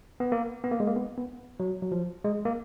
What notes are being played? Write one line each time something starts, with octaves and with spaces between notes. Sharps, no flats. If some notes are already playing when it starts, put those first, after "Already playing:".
B3
A#3
B3
A#3
G#3
A#3
B3
B3
F#3
F#3
F3
G#3
A#3